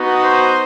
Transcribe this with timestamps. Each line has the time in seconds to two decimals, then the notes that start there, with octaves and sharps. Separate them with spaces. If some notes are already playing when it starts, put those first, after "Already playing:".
Already playing: B3 D#4 F#4
0.22 C5